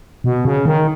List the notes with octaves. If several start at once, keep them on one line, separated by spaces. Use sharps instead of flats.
B2
C#3
D#3